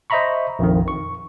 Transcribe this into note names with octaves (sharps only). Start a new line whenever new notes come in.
C5 D#5 E5 A#5 B5 C#6
A#1 F2 D#3
C#6